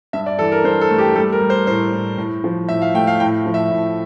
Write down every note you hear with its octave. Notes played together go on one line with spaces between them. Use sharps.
G2 E5
D5
E3 A4
A#4
G2 C5
A4
A3
G4
G3 A4
A#4
G3
C5
A2 C5
A2
A2
F3
A2 E5
F5
A3 G5
F5
A2 G5
F3
E5
A2